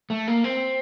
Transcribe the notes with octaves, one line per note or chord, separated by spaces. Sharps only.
A3
A#3
C4